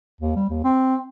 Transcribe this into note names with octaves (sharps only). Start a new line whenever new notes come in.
D#2
G3
D#2
C4